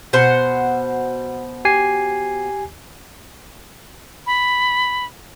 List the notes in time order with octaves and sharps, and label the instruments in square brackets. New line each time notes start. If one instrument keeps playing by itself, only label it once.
[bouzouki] B2 C5 F#5
[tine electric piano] G4 G#5 C7
[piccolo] B5